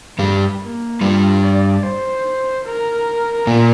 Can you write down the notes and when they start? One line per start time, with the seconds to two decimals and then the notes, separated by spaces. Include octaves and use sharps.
0.19 G2 G3
0.60 A#3
1.01 G2 G3 F4
1.42 D5
1.83 C5
2.65 A#4
3.47 A#2 A#3